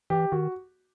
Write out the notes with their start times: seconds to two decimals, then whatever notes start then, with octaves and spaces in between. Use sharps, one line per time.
0.10 E3 G4
0.32 D#3 F#4